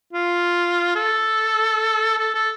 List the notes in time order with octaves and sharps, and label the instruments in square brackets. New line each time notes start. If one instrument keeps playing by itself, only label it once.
[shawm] F4
A4
A4
A4